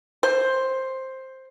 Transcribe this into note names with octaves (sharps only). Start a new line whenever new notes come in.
C5